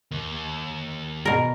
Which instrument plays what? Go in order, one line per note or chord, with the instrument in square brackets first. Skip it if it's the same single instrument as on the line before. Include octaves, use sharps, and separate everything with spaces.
[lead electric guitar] D#2
[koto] B2 A#4